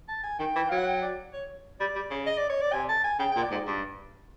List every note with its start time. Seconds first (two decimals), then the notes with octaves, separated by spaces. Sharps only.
0.09 A5
0.24 G#5
0.39 D#3 G5
0.56 E3
0.69 F#3 F5
0.78 F#5
0.86 G5
1.02 D5
1.33 C#5
1.80 G3 D5
1.95 G3
2.10 C#3
2.27 D#5
2.38 D5
2.50 C#5
2.61 D5
2.73 C3 G#5
2.89 A5
3.04 G#5
3.19 C#3 G5
3.32 G5
3.36 A#2
3.43 D5
3.51 G#2
3.55 D5
3.67 G2